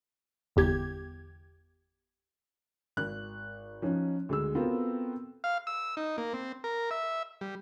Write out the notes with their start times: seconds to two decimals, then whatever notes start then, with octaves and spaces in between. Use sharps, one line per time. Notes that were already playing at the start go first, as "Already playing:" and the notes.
0.56 G1 E2 G4 G#6
2.97 G#1 F#6
3.82 F3 C#4 D#4
4.29 D2 G#3 E6
4.55 B3 C4 F4 F#4 A4 A#4
5.44 F5
5.67 E6
5.97 D#4
6.18 A#3
6.34 C4
6.64 A#4
6.91 E5
7.41 G3